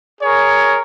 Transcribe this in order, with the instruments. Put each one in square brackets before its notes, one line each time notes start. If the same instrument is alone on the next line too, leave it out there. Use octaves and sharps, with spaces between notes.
[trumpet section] G#4 A#4 C#5